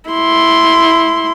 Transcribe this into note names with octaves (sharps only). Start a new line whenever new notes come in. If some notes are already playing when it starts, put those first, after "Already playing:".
E4 C6